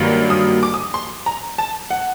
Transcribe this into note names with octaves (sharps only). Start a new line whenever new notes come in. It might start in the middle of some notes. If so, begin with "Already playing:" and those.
Already playing: G2 D#3 F#3 A#3 D4
D#6
D6
D#6
C6
A#5
A5
F#5